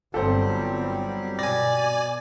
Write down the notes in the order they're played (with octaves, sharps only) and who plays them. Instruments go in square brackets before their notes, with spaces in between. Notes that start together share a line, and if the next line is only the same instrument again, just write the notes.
[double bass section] G1 B3 C4 [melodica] F#3 G3 G4 [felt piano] A4 C5
[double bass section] B2 [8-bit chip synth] D5 G#5 [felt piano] A#6